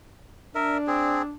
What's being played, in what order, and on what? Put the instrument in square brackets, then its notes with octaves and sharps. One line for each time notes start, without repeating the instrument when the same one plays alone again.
[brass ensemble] D4 [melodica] A#4 E5
[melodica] C4 G#4